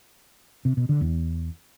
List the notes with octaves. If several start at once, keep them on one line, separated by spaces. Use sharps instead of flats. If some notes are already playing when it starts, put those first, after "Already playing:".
C3
B2
D3
E2